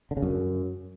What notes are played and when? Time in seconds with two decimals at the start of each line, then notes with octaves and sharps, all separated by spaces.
0.11 D3
0.17 C#3
0.22 F#2